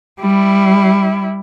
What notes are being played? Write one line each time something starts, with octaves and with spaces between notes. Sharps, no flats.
G3 E4